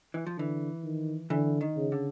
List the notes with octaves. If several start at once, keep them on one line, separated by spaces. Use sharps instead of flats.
E3
F3
D3 E3
D#3
D3 E3
D#3
C#3
D3